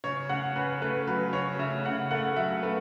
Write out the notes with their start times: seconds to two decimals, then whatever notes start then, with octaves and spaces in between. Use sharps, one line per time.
0.04 C#3 C#5
0.29 C#3 F#5
0.56 C#3 B4
0.81 A3 B4
1.07 F#3 B4
1.33 C#3 C#5
1.59 C#3 E5
1.85 C#3 F#5
2.11 A3 F#5
2.36 F#3 E5
2.63 A3 B4